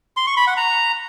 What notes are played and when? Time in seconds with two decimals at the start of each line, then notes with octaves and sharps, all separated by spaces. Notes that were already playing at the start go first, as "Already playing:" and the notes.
0.17 C6
0.27 C#6
0.37 B5
0.47 F#5
0.57 A#5